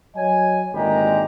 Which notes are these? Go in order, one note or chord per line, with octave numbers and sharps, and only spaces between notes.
F#3 C#5 D#5 G#5
G#1 D2 A#2 G#3 G4 A#5